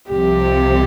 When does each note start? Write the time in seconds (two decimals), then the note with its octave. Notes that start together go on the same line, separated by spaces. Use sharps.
0.10 C2 C3 F3 G4